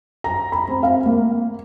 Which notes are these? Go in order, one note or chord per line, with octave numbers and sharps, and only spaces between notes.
A#5
B5
C4
F5
A#3